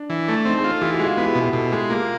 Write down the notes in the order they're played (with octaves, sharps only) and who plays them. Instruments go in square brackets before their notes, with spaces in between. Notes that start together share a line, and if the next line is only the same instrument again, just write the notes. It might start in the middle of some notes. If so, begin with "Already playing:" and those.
Already playing: [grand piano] D4
[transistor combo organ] E3
A3
[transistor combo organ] C4 [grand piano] D#4
[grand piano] G#4
[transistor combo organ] F4
[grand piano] A4
[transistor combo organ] E3 [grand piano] G4
[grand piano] F#4
[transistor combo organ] G#3
[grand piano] F4
[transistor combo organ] B3 [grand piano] E4
[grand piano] G4
F#4
[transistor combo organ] B2
[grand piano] G#4
[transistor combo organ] B2 [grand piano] A4
[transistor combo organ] G#3 [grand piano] G4
[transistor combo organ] A#3 [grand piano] F4